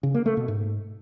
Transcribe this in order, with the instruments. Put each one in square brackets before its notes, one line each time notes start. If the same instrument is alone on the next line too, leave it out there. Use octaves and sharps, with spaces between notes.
[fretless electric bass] C#3
A#3
A3
B2
G#2